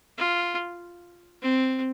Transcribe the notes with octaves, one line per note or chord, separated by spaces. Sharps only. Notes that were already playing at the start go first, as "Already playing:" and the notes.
F4
C4